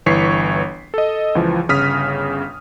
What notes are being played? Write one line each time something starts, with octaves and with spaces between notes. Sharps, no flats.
G1 E3 C#5 C#6 B6 C7
A4 D#5
C#2 E3 F3
G1 C#3 D#6 F6 B6